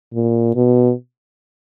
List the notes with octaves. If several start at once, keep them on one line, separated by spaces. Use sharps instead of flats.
A#2
B2